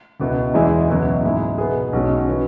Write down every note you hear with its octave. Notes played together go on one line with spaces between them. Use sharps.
C#2 B2 B3 E4
E2 E3 G#3 E4 G#4
C#2 B2 F#3 B3 E4
G#2 G#3 E4
B2 B3 G#4
B1 B2 G#3 C#4 F#4
E3 B3 F#4